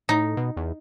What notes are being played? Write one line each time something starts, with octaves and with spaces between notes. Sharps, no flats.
A2 D#4
B2
E2